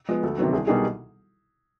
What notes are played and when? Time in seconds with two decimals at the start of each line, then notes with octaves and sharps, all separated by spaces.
0.09 F3 G#3 B3
0.23 D2 A4
0.38 C3 D#3 F#3 B3
0.53 C2 G#4
0.67 B2 G3 A#3 D#4 G#4